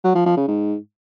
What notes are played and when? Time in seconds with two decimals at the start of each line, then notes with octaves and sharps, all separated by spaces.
0.04 F#3
0.15 F3
0.26 F3
0.37 C#3
0.48 G#2